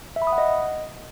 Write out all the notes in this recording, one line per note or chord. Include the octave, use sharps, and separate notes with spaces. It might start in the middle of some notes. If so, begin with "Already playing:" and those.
E5
B5
D#6
F#5
D#5